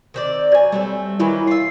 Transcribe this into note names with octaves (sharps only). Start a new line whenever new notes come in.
D#3 C4 D5
F#3 G#5
G3 A3 B3 C4
D#3 E3 F#3 E4
F4 E5 C7